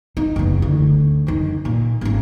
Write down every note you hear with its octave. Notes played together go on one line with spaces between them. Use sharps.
D#4
F#1 E2
D2
F#2 D#3
A#2
G#1 C#4